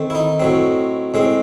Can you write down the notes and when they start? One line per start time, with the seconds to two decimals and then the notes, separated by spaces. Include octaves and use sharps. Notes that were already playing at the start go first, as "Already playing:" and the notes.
Already playing: D#3 A3 C4
0.10 E4
0.15 D#4
0.40 A2 F#3 C4
1.14 A2 G#3 C4